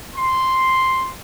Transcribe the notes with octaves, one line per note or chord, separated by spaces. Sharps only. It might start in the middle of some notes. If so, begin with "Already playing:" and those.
C6